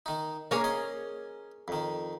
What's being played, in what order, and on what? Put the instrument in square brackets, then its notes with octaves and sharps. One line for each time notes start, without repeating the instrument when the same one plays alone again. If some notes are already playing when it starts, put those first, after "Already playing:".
[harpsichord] D#3 D#4
[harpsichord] A#3 C#4 D4 [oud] G#4 A#4 C#5
[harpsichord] C#4 D#5
F2 D#3